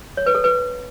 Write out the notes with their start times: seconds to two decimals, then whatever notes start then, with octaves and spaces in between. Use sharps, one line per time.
0.17 C#5
0.26 B4
0.35 A4
0.44 B4